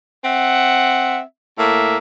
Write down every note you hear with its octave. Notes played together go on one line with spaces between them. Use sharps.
C4 E5 F#5
A2 A#3 E5